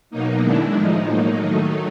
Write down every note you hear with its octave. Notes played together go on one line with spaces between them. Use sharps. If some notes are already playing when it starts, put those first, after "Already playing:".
B2 F#3 A#3 D#4
D#3 G#3 D4 E4
A2 F3 G#3 D#4
A2 F#3 A#3
D#3 F#3 A3 D#4